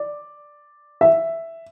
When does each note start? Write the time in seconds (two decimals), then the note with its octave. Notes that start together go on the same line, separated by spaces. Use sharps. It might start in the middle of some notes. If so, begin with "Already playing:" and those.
Already playing: D5
1.01 E5